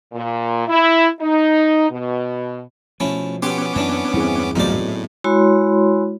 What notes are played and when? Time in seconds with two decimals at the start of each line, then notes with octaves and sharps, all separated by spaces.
0.13 A#2
0.68 E4
1.21 D#4
1.90 B2
3.00 B2 F3 A3 C#4 E4
3.42 B3 C#4 G4 C6 D6
3.76 F#2 E3 C4 D4
4.14 E2 G2 C4 E4 G#4
4.55 C2 G#2 F3 F#3 A3 B3 D#4 D5
4.72 A2
5.24 G#3 E4 F#4 C#5 B5 C6